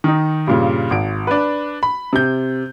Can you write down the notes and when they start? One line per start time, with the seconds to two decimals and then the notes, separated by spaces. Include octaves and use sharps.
0.04 D#3 D#4
0.47 G2 A#2 C#3
0.91 G#1 D7
1.27 D4 B4
1.83 B5
2.13 C3 G6